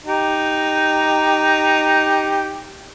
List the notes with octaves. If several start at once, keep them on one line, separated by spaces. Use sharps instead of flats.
D#4 G4